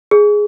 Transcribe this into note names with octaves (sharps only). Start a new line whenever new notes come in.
G#4